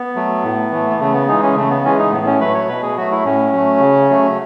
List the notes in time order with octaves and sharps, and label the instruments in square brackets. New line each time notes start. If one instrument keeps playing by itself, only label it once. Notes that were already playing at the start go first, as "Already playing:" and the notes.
Already playing: [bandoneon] B3
F#3 A3
A2
E3 A3
B3
C#3 A3
B3
E3 G#3 D#4
C#4
C#3 A3
B3
E3 G#3 C#4
D#4
A2 B3
C#4
F#3 A3 B4
C#5
B2 B4
G#4
F#3 A3 F#4
E4
A2 C#4
F#3 A3
C#3
F#3 A3